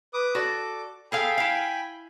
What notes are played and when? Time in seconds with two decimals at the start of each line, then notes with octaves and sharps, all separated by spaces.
0.14 B4 D6 D#6
0.35 F#4 A4 D5 D6
1.12 G#4 A4 F5 G5 G#5 B5
1.38 E4 F5